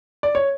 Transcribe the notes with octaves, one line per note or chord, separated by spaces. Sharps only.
D5
C#5